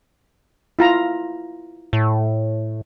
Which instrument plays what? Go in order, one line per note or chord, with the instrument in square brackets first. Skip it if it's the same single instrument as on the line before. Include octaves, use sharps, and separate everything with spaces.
[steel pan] E4 F4 A#5
[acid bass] A2